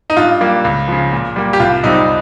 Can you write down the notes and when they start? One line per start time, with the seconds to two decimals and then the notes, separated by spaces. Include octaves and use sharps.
0.10 D#4
0.17 G2 F4
0.41 G3 A#3
0.65 C#2
0.88 C#3 F3
1.12 A#2
1.36 G3 A#3
1.53 G4
1.60 C2 F4
1.83 C3 G3 C4 D#4